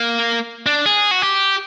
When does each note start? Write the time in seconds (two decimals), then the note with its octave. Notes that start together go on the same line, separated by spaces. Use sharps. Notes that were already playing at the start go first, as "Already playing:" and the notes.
Already playing: A#3
0.66 D4
0.86 G#4
1.11 F#4
1.22 G4